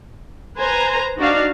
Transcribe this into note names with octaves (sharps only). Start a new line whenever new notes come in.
B4 C5 G#5 A#5
D4 D#4 F#4 D5 F5